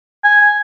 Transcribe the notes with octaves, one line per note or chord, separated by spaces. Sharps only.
G#5